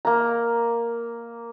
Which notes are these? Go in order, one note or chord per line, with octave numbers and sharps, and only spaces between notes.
A#3 A#5